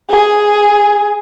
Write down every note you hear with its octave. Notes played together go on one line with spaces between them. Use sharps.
G#4